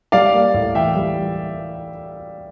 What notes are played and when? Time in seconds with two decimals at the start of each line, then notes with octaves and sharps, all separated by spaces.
0.12 G3 D5 F5
0.33 A#3
0.54 A2
0.75 E3 E5 G5
0.96 G3